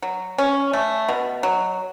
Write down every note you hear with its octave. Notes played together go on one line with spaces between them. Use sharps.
F#3
C#4
A3
B2
F#3